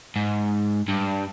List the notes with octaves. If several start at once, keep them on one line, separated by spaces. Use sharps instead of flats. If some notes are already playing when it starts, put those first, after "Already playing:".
G#2
G2